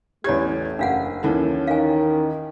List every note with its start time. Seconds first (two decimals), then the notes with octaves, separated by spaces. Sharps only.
0.24 A1 E2 A3 C#4 G4 C#5 D5 G#6
0.79 F#1 D4 F5 F#5
1.23 D#2 E3 C#4 A4
1.67 D#3 F5 G#5